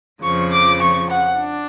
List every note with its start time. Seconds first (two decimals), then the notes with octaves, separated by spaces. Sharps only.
0.22 F2 C#3 F3 C#6
0.52 D6
0.80 C#6
1.10 F#5
1.39 D4